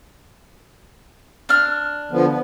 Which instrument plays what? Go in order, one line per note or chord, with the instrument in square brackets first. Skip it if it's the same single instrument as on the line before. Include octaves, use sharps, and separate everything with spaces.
[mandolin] D4 F6
[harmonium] D3 F3 B3
B3